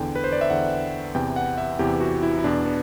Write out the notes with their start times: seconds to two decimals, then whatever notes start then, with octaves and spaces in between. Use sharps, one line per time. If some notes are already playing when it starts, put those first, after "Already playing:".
Already playing: E2 D3 G5
0.15 B4
0.24 C5
0.32 D5
0.41 E5
0.50 E2 D3 F#5
1.14 E2 C3 E3 G5
1.36 F#5
1.58 E5
1.79 E2 C3 E3 G4
2.00 F#4
2.22 E4
2.39 E4
2.44 E2 B2 D4
2.66 B3